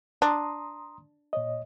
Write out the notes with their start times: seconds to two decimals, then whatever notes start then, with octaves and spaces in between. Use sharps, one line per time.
0.22 D4 A#5 C6 D#6
1.33 A#2 C#5 D#5